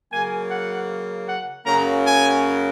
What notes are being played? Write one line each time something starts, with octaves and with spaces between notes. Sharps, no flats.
C#3 F#3 A#3 G#5
F#5
F#5
F#2 C#3 F#3 A#3 A#5
G#5